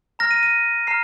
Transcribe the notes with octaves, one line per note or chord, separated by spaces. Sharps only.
A#5 F6 A#6
D#7
D#7
A#5 F6 C7